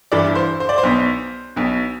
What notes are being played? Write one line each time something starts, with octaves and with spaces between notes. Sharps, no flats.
G1 G2 E3 D5
C5
C5
D5
C5
B1 B2
B1 B2